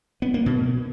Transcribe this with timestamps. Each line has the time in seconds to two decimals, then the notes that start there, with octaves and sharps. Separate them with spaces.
0.22 B3
0.34 A#3
0.46 B2